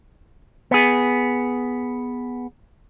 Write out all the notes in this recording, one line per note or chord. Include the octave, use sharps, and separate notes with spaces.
B3 G#4